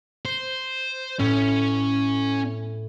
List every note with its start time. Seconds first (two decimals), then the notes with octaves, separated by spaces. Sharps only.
0.25 C5
1.19 A2 C#4